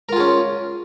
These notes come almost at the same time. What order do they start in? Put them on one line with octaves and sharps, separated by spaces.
A#4 F4 G#4 C#4